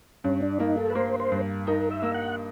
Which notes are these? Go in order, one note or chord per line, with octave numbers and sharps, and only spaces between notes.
G2 C#4
D4
A#3 D#4
A4
B4
A#3 C5
C5
G2
D#4 A#4
E5
A#3
F#5